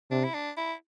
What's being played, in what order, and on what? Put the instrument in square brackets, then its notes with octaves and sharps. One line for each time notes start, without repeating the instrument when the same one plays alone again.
[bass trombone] C3 [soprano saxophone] D4
[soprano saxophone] E4
D4
E4